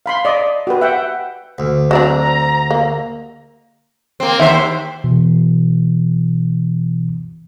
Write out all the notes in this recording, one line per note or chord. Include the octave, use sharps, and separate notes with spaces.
F5 B5 C6
D5 D#5 D6
F#4 G4 B4
E5 F#5 G5
D2
F#3 C4 D4 A#5
A#3
A#3 C4
D#2 C5 E5
B2 E3